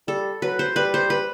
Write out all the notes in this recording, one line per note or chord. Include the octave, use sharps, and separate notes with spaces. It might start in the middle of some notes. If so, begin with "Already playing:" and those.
G3 A4
F#3 B4
C5
G3 B4
C5
B4